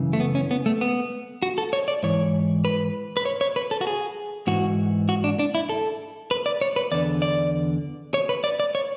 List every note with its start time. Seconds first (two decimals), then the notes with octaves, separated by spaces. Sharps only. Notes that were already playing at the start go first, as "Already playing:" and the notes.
Already playing: F#2 C#3 E3
0.13 A3
0.20 B3
0.35 C#4
0.51 B3
0.66 A3
0.81 B3
1.43 F#4
1.58 A4
1.73 C#5
1.88 D5
2.03 G#2 E3 C#5
2.65 B4
3.17 B4
3.25 C#5
3.41 C#5
3.56 B4
3.71 A4
3.81 F#4
3.87 G#4
4.47 G#2 E3 F#4
5.09 F#4
5.24 D4
5.39 D4
5.55 E4
5.69 A4
6.31 B4
6.46 D5
6.61 C#5
6.76 B4
6.92 E2 D3 D5
7.22 D5
8.14 C#5
8.29 B4
8.44 D5
8.60 D5
8.75 C#5